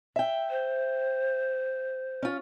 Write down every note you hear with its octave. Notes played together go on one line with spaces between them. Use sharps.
E5 G5
C5
C#4 F4